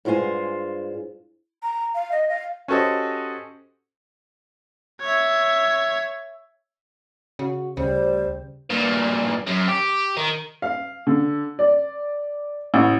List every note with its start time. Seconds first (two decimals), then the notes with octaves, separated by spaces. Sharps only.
0.05 G2 G#3 F4 C5 G#5
1.63 A#5
1.95 F5
2.12 D#5
2.29 F5
2.68 C#4 F#4 G4 A4 C5 D#5
5.01 C#5 E5
7.39 C#3 F#4
7.77 D2 C#3 G3 C5
8.70 G2 A#2
9.47 F#2
9.68 G4
10.17 D#3
10.62 F5
11.07 D3
11.59 D5
12.74 A1